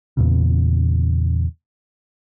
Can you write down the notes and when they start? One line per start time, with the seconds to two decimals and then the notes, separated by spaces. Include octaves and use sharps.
0.17 E2 A#2 C#3